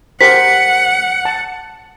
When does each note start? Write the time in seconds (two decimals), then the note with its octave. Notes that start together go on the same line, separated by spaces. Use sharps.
0.21 G4 A#4 C5 F#5 B6
1.25 A5